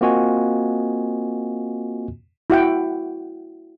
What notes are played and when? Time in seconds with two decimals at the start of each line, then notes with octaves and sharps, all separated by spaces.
0.01 A#3 C4 F4 F#4 D#5 G#5
2.50 E4 F#4 F#5 G5